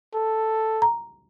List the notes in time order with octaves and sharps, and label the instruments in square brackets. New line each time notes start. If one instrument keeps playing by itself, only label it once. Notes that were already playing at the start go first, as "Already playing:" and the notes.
[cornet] A4
[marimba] A#5